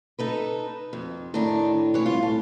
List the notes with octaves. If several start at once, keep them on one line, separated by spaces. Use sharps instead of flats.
D#4 A4 B4
F2
A2 D#3 D4
E3 C#5
C2 F4
A2 A5